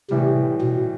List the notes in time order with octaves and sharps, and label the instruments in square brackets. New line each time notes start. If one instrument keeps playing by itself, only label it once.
[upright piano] A2 E3 G3 [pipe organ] C3
[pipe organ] B2